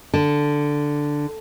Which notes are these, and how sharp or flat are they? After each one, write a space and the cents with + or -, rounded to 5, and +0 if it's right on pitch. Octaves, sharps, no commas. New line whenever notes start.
D3 +0 A5 +0